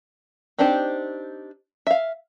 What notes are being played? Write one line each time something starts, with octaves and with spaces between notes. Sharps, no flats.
C4 D4 D#4 G4 C5
E5 F5